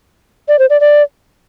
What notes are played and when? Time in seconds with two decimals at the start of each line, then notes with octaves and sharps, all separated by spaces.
0.48 D5
0.59 C5
0.70 D5
0.81 D5